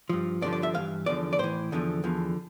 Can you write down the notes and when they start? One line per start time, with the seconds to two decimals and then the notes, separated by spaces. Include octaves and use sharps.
0.09 G2 F3
0.42 G2 D3 F3 D5
0.53 D5
0.63 E5
0.74 G2 E3 F5
1.06 E2 D3 F3 D5
1.33 D5
1.39 A2 E3 C5
1.72 E2 D3 F3
2.04 E2 D3 F3